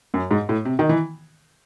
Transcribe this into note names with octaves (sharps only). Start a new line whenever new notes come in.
F#2
G#2
A2
C3
D#3
E3